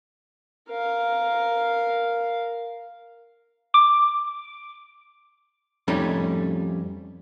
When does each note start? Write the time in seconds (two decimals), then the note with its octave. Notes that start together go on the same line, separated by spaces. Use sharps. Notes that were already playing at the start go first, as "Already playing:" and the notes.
0.69 A#4 F5
3.74 D6
5.88 F2 G3 A3 C#4 D#4